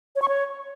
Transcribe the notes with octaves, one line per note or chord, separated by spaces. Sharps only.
C#5
C#6
C#5